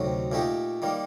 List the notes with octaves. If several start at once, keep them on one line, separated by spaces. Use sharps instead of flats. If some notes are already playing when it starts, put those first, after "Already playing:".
Already playing: D2 C3 D#3 F#3
A#2 A3 D#4 G4
D#3 G3 A#3